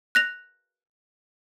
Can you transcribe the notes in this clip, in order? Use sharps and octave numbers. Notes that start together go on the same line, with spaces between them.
F#6 A#6 F7